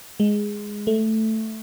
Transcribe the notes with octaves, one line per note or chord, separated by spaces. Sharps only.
G#3
A3